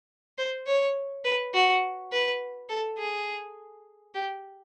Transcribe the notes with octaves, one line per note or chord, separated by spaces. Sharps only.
C5
C#5
B4
F#4
B4
A4
G#4
G4